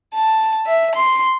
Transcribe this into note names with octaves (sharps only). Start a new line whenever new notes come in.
A5
E5
C6